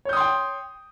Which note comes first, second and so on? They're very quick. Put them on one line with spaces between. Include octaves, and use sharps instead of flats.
C#5 G6 D#6 C6 G5